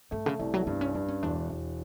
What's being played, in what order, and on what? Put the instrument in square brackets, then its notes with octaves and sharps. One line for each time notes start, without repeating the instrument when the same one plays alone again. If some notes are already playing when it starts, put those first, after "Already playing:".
[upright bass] G2 [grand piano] A3
[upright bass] C#3
[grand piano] C2 [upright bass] C#3
[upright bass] F#3
[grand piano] G2 [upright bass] B3
[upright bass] C#4
[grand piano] G2 [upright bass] D4
[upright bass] C#4
[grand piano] E1 [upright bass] D4
[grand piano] E1